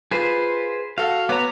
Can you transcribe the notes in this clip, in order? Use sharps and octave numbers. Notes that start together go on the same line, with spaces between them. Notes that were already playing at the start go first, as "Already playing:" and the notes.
F4 G#4 B4 C5
F#4 A4 F5
B3 C#5 A#5 D6